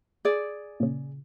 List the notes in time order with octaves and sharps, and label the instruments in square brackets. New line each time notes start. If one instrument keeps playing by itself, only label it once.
[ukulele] G#4 D5
[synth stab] A#2 C#3